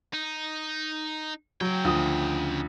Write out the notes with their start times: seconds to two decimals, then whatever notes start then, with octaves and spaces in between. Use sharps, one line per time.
0.14 D#4
1.61 C#3 F#3 G5
1.85 D2 F3 D#6